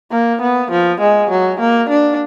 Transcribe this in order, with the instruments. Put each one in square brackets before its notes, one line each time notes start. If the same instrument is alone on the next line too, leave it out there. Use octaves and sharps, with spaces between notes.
[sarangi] A#3
B3
F3
G#3
F#3
A#3
D4